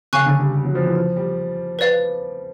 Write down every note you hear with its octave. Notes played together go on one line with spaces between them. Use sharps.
C#3 F5 G#5 C#6 F#6
D3
G3
G3
F#3
F3
E3
F3
G3
B4 D5 F5